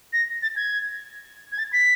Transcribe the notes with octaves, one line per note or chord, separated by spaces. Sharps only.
A#6
A6
G#6
G#6
A6
B6